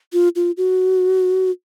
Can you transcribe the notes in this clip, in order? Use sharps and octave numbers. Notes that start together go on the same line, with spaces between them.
F4
F4
F#4